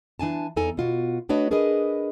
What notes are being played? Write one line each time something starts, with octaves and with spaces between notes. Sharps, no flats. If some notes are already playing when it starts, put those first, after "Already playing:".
E3 D4 G#5 A5
E2 D#4 A4 G#5 A#5
B2 F4 F#4
A3 D4 F#4 B4 C#5 D#5
D4 G#4 A#4 B4 D#5